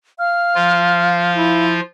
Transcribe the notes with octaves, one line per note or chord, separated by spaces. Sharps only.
F5 F6
F3 F4
E4